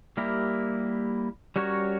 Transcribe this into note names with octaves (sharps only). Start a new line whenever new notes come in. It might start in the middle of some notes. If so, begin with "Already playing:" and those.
G3 A#3 E4 G4 A#4
G3 C#4 F#4 A#4 C#5